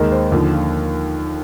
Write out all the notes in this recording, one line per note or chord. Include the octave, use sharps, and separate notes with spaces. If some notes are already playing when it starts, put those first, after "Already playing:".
Already playing: D#2 D#3 G#3 A#4
C5
D#2 D3 F3
F4